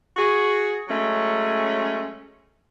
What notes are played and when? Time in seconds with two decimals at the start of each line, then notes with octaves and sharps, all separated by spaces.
0.16 F#4 G#4
0.88 F#3 G#3 A3 C#4